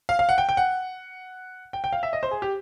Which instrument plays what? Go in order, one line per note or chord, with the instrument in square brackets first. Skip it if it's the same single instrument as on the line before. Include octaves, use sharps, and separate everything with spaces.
[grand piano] F5
F5
F#5
G5
G5
F#5
G5
G5
F5
E5
D#5
C5
G#4
G4